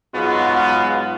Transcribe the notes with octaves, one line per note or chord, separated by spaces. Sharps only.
G#2 F#3 G#3 B3 F4 F#4